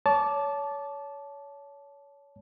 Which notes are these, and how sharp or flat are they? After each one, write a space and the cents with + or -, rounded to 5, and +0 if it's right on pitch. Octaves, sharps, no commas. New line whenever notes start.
C#5 +25 A5 -15 D6 +0